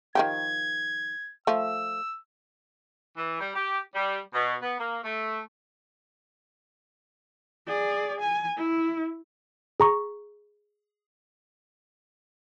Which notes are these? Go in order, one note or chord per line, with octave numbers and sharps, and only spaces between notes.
D#3 F3 G4 G#6
F3 A3 E6
E3
G3
G4
G3
B2
B3
A#3
A3
G#4 D5
G#5
E4
G#4 A#5 C#6